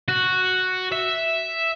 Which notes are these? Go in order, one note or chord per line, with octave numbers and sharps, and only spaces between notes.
F#4
E5